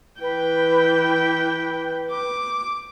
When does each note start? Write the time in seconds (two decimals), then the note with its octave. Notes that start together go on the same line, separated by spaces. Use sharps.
0.21 E3 B4 G5
2.12 D6